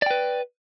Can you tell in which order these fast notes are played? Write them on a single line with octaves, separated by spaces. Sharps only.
D5 G5 B4